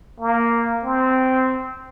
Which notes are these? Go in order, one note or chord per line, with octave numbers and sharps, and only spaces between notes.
A#3
C4